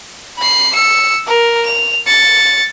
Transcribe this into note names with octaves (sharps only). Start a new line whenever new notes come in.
B5 C7
E6 C#7
A#4
F7
A6 C#7